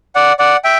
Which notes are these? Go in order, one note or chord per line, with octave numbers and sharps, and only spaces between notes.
D5 F#5
D5 F#5
E5 G5